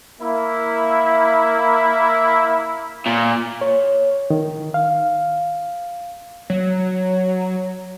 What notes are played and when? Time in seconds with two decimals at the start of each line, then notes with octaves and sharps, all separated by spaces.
0.21 A#3 E4
3.06 A#2
3.61 C#5
4.30 D#3
4.74 F5
6.50 F#3